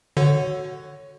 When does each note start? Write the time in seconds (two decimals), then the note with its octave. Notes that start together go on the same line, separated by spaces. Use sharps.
0.17 D3 F#4 C#5